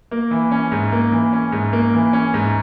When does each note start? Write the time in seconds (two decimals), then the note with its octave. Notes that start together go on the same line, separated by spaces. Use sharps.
0.11 A#3
0.31 E3
0.51 C#4
0.72 G#2
0.92 A#3
1.12 E3
1.33 C#4
1.52 G#2
1.73 A#3
1.94 E3
2.13 C#4
2.34 G#2